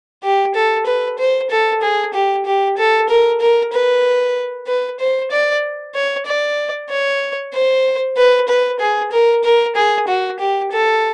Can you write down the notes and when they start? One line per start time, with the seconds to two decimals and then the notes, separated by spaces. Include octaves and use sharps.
0.23 G4
0.55 A4
0.86 B4
1.19 C5
1.50 A4
1.82 G#4
2.14 G4
2.46 G4
2.77 A4
3.09 A#4
3.41 A#4
3.72 B4
4.67 B4
5.00 C5
5.31 D5
5.94 C#5
6.26 D5
6.90 C#5
7.53 C5
8.17 B4
8.48 B4
8.80 G#4
9.12 A#4
9.44 A#4
9.76 G#4
10.08 F#4
10.39 G4
10.71 A4